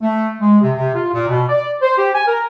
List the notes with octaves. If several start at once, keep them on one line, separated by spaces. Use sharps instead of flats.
A3
G#3
C3
C3
F4
A#2
B2
D5
C5
G4
G#5
A#4